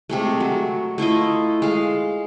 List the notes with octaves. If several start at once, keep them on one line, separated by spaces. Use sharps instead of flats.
C3 G#3 A3
F#3
A3 E4 F4 D#5
G#3 F5